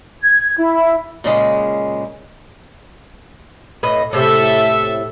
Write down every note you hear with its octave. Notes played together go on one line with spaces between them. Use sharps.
G#6
E4
A#2 C#3 G#3
A2 B4 D#5
A2 C3 A4 E5 G5